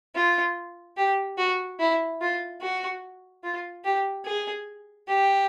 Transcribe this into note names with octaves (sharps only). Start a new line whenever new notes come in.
F4
G4
F#4
E4
F4
F#4
F4
G4
G#4
G4